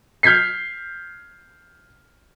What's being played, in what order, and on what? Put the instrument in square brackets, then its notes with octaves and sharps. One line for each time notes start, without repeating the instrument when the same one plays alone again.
[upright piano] F6 G6 G#6 B6 C7